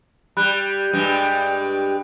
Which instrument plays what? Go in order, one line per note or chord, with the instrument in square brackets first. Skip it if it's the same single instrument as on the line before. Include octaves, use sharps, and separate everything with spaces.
[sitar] G3 [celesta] B5 F#6
[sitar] G2 G3 G#3